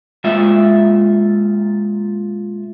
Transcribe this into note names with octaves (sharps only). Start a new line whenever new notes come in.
A#2 G#3 F4 E5